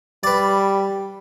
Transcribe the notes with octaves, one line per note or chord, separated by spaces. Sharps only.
G3 B4 D5